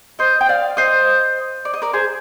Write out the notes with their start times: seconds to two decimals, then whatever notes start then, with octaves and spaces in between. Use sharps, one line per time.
0.19 C5 D#5
0.41 G5
0.49 D5 F5
0.77 C5 D#5
1.65 D5
1.74 D#5
1.82 A#4 D5
1.93 G#4 C5